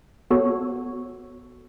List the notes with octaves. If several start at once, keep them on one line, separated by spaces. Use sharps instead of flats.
B3 F#4 A4 C#5